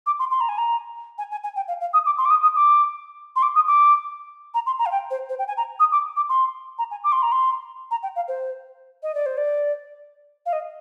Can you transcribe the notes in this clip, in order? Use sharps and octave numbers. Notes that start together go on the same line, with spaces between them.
D6
C6
C6
A#5
G#5
A#5
G#5
G#5
G#5
G5
F5
F5
D#6
D6
C6
D6
D#6
D#6
D6
C6
D6
D#6
D6
A#5
C6
A#5
F5
G5
C5
C5
G5
G#5
A#5
D#6
D6
D6
C6
A#5
G#5
D6
C6
A#5
C6
A#5
G5
F5
C5
D#5
D5
C5
D5
F5
D#5